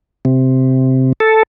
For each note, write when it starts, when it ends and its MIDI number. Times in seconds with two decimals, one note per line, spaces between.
0.25 1.13 48
1.20 1.43 69